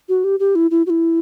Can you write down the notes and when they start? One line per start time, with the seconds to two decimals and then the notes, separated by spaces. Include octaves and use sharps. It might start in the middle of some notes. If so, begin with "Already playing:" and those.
0.09 F#4
0.24 G4
0.40 G4
0.55 E4
0.71 E4
0.86 F#4
0.90 E4